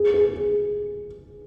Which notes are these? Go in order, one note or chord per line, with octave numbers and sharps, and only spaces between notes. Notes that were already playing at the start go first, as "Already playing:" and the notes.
Already playing: G#4
G#4
G#4